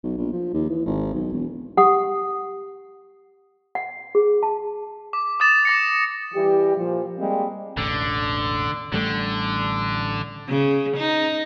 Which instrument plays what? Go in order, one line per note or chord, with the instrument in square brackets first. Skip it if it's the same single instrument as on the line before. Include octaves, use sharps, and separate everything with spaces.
[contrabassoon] B1
A#1
F3
D#2
E3
G#1
B1
E1
[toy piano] G4 F#5 A5 D#6
F#5
G#4
A5
[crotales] D6
D6 D#6 A6 E7
D6 A#6 C#7
[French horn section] E3 G3 G4
A#2 F3
G3 G#3 A#3 C4
[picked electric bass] E1 A1 [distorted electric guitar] D3
[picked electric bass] A1 G3 A3 [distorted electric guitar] D3
[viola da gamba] C#3
D#4